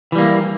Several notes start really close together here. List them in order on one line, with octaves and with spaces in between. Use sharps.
E3 G3 A#3